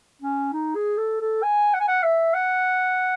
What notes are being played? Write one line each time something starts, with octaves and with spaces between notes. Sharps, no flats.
C#4
D#4
G#4
A4
A4
G#5
F#5
G#5
F#5
E5
F#5